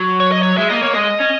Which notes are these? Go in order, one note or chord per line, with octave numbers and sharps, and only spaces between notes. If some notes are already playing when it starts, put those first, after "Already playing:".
Already playing: F#3
C#5
D#5
C#5
G#3 E5
A#3 D#5
A#3 C#5
G#3 D#5
C#4